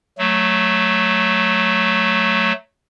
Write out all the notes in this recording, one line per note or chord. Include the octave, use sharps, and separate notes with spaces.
F#3 A3